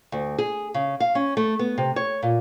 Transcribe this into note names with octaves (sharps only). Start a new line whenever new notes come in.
D2
G#4
C#3
F5
C#4
A3
B3
C3
C#5
A#2